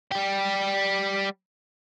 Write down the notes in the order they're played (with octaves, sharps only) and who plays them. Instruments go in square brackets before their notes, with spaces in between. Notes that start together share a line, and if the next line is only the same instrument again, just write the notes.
[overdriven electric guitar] G3 G4